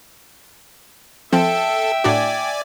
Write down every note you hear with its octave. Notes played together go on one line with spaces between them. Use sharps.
F3 C4 A4 E5 G5
A2 D4 F#4 D5 G#5